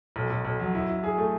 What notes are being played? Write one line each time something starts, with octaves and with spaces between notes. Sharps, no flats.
B1
B1
B1
F#3
E4
E4
G#4
A3